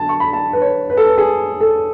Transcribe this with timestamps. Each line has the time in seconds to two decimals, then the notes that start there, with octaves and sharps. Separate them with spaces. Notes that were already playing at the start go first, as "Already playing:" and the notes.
Already playing: D3 F#3 B3 A5
0.09 C#6
0.20 B5
0.33 A5
0.53 B4
0.62 C#5
0.90 B4
0.97 A4
1.06 B4
1.18 G#4
1.61 A4